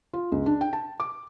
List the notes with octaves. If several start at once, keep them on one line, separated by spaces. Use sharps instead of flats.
F4
C#2
D4
G5
A5
D6